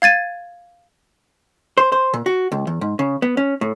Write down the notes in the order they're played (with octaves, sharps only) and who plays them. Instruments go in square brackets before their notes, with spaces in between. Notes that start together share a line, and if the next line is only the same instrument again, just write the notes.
[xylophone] F5 G#6 A6 D#7
[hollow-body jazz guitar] C5
C5
A#2
F#4
C#2
E2
G#2
C#3
B3
C#4
A2